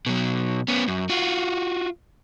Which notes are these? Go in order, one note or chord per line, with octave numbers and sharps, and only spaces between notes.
B2 F#3
B3 C#4
F#2
F4 F#4